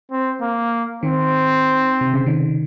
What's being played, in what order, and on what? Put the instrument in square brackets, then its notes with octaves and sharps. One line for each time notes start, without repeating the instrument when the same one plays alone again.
[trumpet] C4
A#3
[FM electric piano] D#3 [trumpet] C4
[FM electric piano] C3
C#3
D#3